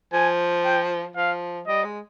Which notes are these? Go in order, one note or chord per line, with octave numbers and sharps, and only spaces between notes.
F3 G#5
G5
F3 F5
G3 D#5
G#3